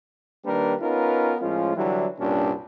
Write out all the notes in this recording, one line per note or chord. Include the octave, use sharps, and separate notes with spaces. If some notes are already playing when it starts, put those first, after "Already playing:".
D#3 G3 A#3 D4 A#4 B4
B3 C#4 D#4 F4 A#4 B4
A2 F3 G#3 C#4 F4
D3 E3 F#3 G3 D4 E4
C2 G2 A#2 C#4 D4